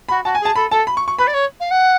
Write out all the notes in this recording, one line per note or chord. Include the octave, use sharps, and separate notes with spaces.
F#4 B5
F#4 A5
G#5
G#4
A5
A4 B5
A4 A5
B5
C#6
C#6
B4 B5
D5
C#5
F5
F#5